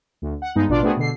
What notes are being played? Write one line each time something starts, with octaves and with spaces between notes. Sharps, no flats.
D2
F#5
G2 G#3 B3 D#4
A1 B2 D4 F4 D5
A3 B3 C4 D4 F#4 G#4
B2 D3 C7